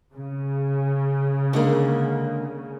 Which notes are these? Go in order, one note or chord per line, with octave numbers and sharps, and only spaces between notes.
C#3
D3 G#3 A#3